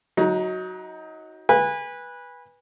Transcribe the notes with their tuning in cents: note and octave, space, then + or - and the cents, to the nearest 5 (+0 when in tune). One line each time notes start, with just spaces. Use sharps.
F#3 +0 D#4 +25
B4 -15 G#5 -30